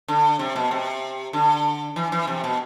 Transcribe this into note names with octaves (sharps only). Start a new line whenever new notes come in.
D3
C3
B2
C3
D3
E3
E3
C3
B2